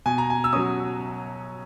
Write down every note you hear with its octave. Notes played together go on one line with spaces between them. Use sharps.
B2 G#5
A#5
G#5
E6
F#3 C#4 D#6